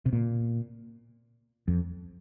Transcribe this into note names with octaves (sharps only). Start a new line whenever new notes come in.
C3
A#2
F2